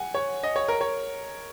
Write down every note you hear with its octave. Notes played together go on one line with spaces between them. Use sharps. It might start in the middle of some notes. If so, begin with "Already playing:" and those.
Already playing: F#5 G#5
C#5
D#5
C#5
A#4
C#5